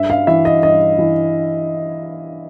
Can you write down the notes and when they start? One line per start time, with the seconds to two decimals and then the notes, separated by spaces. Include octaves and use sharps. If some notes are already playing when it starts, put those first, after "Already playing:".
Already playing: G2 E5
0.10 F5
0.27 E3 E5
0.45 D#5
0.63 G2 D#5
0.99 E3